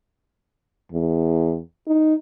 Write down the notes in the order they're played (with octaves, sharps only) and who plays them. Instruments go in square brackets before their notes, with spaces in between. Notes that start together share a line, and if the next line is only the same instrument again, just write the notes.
[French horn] E2
D#4